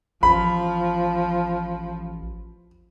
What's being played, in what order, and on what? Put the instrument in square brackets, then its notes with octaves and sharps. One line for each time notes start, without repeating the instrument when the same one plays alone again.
[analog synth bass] A1 [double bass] F3 [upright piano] B5